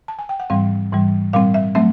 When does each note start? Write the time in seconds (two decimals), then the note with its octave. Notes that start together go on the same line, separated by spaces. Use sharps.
0.08 A5
0.19 G#5
0.29 G5
0.40 F#5
0.50 G#2 E3 G3 C4 F5
0.92 G#2 E3 G3
1.33 A#2 G3 C4 F5
1.54 E5
1.75 F#3 A3 C4 E5